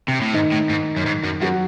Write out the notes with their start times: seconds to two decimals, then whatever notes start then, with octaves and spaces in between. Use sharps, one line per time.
0.08 C3
0.21 A2
0.33 G#2 D#3 D#4
0.52 A2
0.70 G#2
0.97 F#2
1.06 G#2
1.24 F#2
1.42 F#2 F#3 F#4